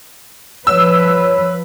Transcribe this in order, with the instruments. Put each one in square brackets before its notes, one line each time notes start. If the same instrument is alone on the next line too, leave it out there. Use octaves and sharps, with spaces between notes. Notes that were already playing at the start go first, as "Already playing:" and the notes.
[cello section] F3 B4 [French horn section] C#5 [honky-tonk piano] E6